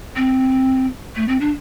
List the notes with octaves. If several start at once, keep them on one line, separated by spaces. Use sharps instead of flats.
C4
A3
C4
D4